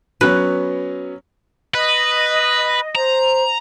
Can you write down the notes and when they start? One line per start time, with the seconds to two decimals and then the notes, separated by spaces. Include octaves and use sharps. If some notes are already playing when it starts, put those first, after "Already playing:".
0.21 F#3 B3 C#4 B4
1.75 B4 D#5
2.95 C5 A#5